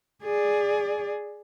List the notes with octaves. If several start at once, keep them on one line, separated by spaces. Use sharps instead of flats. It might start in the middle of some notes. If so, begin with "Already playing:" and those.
G#4 D5